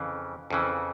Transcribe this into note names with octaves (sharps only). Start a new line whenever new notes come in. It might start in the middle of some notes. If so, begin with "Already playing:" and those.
Already playing: F2 C#3 E3
F2 C#3 E3